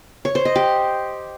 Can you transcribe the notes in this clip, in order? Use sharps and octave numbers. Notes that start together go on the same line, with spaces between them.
C#5
C5
D#5
G4